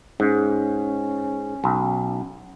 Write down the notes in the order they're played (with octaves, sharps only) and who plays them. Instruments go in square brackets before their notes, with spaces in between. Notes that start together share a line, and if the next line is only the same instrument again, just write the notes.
[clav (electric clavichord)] G#2 [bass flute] C#4
[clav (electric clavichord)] B1